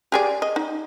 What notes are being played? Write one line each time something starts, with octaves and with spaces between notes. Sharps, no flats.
G4 G#4 D5
D#5
D#4